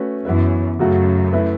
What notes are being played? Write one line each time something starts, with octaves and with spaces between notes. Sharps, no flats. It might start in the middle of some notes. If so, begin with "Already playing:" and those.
Already playing: A3 C#4 F#4 B4
F#2 E3 B3 E4 B4 E5
F#2 C#3 F#3 A3 F#4
A3 E4 B4